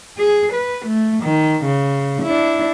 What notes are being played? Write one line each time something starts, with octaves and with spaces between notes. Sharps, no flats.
G#4
B4
A3
D#3
C#3
D4 E4